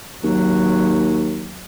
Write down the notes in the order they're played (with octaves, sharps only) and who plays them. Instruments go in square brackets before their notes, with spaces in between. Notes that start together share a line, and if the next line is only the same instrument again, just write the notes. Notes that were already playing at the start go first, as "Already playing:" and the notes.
[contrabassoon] D#2 [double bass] F#3